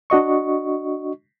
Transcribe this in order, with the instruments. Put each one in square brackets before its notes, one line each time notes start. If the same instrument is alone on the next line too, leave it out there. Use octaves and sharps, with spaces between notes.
[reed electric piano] D4 F#4 D#5 C#6